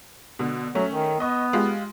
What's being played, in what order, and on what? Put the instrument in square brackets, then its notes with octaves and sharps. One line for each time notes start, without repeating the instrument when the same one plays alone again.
[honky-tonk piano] B2 D3
[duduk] F#3 [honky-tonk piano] A3 C#4
[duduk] D#3
[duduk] B3 [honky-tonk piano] D#5 C#6
[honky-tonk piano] G#3 F4 G4